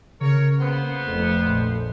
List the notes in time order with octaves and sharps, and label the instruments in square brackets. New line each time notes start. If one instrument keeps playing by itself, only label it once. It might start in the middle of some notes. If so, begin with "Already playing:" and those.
[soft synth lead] C#3 [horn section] A#4 C#5
[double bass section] A#3 [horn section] B3 C5
[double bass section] F1 F2 [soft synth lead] A3
[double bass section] A#1